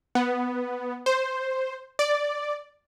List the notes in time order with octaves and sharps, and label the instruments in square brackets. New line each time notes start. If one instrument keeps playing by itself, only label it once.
[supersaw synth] B3
C5
D5